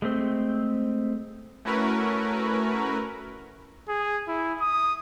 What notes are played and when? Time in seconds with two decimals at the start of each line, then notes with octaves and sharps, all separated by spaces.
0.02 G#3 A3 C4
1.65 A3 C#4 E4 F#4 A#4 B4
3.89 G#4
4.28 E4
4.61 D#6